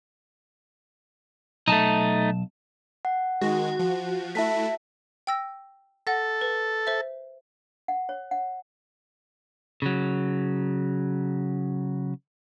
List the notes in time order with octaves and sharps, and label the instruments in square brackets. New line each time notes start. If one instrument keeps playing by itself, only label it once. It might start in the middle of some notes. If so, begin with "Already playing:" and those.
[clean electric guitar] B1 A5 [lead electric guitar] A3 D#4
[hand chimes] F#5
[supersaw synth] D#3 G#3 [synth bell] F#4
[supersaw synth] F3
[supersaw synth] A3 E4 [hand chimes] E5 A5 B6
[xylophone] G5 E6 A#6
[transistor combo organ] A4 [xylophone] F#5 A#6
[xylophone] B4
C5 E5
[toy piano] F#5
C#5
F#5
[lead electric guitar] C#3 F#3